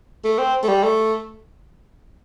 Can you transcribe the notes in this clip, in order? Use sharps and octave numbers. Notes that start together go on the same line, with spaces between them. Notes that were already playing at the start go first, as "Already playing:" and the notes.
A3
C4
A3
G3
A3